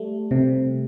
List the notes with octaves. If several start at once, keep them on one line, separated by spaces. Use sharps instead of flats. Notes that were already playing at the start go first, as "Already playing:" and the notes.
Already playing: G3 A3
C3